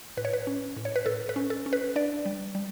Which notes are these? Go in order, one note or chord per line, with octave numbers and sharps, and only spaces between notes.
A2 B4
C#5
B4
C#4
A2
C#5
B4
A2 A4
B4
C#4
A4
C#4
B4
D4 D5
G3
G3